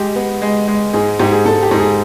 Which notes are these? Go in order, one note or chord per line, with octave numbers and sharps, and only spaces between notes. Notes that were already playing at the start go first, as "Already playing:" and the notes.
Already playing: G#3 G4
B3
G#3
G#3
G#2 G#4
G#2 G4
G#4
G#2 A4
G4
G#2
G#4